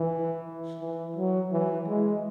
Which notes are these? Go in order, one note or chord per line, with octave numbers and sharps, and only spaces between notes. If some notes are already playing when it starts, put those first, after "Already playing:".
Already playing: E3
E3
F#3
E3
G#3